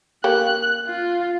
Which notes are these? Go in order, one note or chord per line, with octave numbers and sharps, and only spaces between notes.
A#3 G4 C#5 F#6
F4